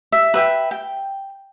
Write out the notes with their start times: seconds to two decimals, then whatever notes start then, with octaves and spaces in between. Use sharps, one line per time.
0.12 E5
0.34 B4 E5 G5
0.71 G5